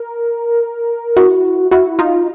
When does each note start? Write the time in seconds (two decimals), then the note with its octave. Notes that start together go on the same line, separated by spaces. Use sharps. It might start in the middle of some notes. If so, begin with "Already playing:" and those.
Already playing: A#4
1.17 E4 F#4
1.71 E4 F#4
1.99 D#4 F4